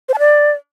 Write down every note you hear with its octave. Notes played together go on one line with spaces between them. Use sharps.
C5
A5
D5